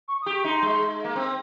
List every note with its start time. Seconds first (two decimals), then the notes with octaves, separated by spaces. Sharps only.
0.08 C#6
0.22 D#6
0.26 G4
0.35 C#6
0.44 D#4 C6
0.62 G#3
1.05 A#3
1.16 C4